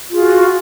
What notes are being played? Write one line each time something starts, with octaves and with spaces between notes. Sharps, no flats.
F4 F#4 G#4